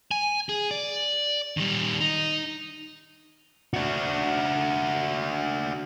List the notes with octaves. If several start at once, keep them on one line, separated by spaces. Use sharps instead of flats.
G#5
G#4
D5
D#3 G3
D#4
D4 F#4